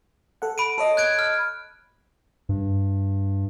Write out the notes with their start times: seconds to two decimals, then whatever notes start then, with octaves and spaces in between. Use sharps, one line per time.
0.42 A4 F#5
0.58 B5 D7 D#7
0.78 A4 C#5 D#5
0.97 F#6 G#6 D7
1.19 F6
2.49 G2